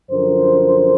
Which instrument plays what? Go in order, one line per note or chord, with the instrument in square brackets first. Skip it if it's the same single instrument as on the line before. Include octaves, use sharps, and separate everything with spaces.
[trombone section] F#2 D3 F3 A#4 C5